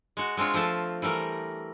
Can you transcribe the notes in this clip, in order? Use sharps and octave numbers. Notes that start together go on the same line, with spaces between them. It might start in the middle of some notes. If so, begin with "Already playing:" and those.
G#3 F#4
G#3 C4 D4 F4 C#5
F3 A3 C5 A5
E3 G3 A3 A#4